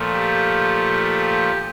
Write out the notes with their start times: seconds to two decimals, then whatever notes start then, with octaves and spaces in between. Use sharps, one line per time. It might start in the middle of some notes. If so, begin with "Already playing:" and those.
Already playing: A#2 F3 A3
0.13 G4